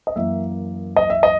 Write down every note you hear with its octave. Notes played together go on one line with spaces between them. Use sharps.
D#5
F#2 E3 A#3 E5
D#5
E5
D#5